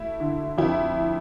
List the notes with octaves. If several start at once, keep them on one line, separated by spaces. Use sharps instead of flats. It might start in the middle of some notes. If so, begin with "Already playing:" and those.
Already playing: A3 E4
D3
F2 E4